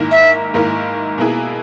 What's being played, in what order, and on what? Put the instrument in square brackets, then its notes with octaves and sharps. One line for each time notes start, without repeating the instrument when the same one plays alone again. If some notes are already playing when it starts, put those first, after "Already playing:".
Already playing: [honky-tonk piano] G#2 D#3 A#3 E4 A#4
[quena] E5
[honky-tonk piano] G#2 D#3 A#3 E4 A#4
B2 A#3 E4 G#4